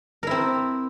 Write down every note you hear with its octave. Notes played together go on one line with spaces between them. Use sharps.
C4 E4 A#4